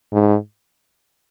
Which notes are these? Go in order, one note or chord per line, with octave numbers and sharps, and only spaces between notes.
G#2